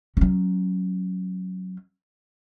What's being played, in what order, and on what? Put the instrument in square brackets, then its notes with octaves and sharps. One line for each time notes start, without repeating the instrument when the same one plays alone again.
[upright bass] F#3 C#4